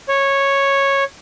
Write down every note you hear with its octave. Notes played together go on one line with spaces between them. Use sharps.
C#5